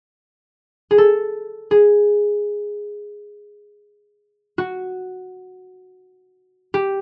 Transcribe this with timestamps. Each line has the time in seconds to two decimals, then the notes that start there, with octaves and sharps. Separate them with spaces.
0.91 G#4
0.98 A4
1.71 G#4
4.58 F#4
6.74 G4